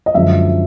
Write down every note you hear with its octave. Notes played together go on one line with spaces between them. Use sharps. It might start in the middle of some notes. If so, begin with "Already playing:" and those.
D#5
F#2 D3 F3 G#3 E5